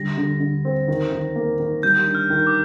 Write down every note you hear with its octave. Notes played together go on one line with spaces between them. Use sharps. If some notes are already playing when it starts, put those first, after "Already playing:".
Already playing: D3 G3 A#6
D3
D3
C4
D#3
D#3
A#3
D#3
G3 G6
D4
F6
D#3
D6